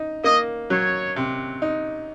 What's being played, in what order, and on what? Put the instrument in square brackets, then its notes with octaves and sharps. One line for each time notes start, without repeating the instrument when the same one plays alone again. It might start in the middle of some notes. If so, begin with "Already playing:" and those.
Already playing: [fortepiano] D#4
[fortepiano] A#3 [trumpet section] D#5
[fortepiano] F#3 [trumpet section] C#5
[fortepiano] C3
D#4